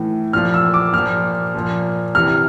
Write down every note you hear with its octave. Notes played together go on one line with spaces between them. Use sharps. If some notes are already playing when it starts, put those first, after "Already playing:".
Already playing: A2 E3
A#2 F3 F6
E6
D6
A#2 F3 F6
A#2 F3
C3 E3 F6